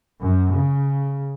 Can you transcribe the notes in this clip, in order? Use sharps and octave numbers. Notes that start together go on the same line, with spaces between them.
F#2
C#3